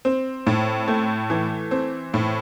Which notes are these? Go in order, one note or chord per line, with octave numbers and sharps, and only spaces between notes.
C4
A2
A3
E3
C4
A2